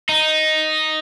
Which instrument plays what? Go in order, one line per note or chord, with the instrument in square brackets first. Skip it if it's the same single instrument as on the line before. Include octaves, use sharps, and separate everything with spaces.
[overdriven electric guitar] D#4